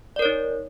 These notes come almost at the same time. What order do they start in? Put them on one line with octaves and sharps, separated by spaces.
D5 A#4 C#5 D#4